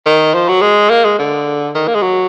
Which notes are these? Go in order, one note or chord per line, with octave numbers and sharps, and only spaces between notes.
D#3
F3
F#3
G#3
A#3
G#3
D3
D#3
A#3
G#3
F#3